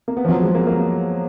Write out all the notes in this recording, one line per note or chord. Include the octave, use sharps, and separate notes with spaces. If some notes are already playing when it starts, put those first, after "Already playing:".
A#3
B3
F3
F#3
G#3
A#3
A#3